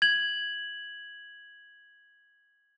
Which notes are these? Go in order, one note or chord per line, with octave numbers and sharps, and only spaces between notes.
G#6 F#7